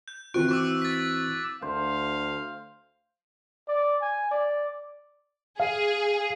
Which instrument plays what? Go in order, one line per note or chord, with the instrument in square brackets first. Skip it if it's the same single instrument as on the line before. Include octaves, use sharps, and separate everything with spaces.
[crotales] G6
[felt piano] E3 C4 F#4 [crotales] C#6 F#6 D7
[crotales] C#6 D6 E6
A6 B6
[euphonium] D2 [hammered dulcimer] C5 [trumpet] F5
[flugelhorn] D5
G#5
D5
[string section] G#4 [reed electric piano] F5